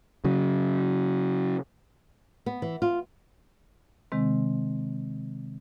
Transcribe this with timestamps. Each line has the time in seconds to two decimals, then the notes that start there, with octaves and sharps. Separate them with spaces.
0.25 C#3 F#3
2.46 B3
2.62 E3
2.82 F4
4.12 C3 D#3 G#3 C4